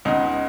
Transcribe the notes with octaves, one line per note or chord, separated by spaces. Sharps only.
C#2 C#3 G#3 B3 D#4